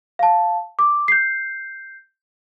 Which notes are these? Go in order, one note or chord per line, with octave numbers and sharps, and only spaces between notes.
F5 A5
D6
G6 C7